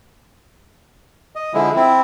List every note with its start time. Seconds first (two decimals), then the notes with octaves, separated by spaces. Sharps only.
1.36 D#5
1.54 D3 F3 G#3 E4
1.76 C4 E4